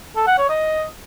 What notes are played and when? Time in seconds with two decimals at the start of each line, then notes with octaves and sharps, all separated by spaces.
0.16 A4
0.27 F#5
0.38 C#5
0.49 D#5